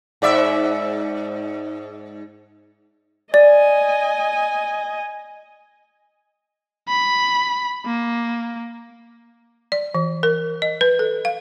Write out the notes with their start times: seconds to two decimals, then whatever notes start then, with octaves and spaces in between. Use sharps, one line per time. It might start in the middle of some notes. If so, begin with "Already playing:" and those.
0.22 G#2 D5 E5
3.34 D5 D#5 G#5
6.88 B5
7.86 A#3
9.72 D5
9.95 E3
10.23 A#4
10.62 D#5
10.81 B4
10.99 A4
11.25 F5